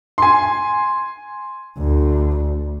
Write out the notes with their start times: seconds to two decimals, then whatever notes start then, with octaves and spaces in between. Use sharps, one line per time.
0.18 G#5 C6
1.78 D2